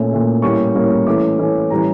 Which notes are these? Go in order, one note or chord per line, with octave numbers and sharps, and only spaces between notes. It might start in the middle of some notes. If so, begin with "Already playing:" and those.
Already playing: A#2 A3 C#4
A#2 A3 C#4
A2 G3 A#3 C#4 C#6
A2 G3 A#3 C#4
E3 A3 C#4 D6
E3 A3 C#4
A2 E3 G3 C#4 A#5